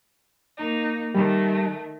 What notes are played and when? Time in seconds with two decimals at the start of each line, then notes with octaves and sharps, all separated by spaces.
0.57 A#3 D#4
1.15 D#3 G3 A3